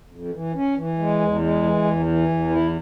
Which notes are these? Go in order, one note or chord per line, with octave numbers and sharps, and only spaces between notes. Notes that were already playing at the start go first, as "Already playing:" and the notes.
F2
E3
C#4
E3
G#3
E2
G#3
E3
E2
E3
E2
E4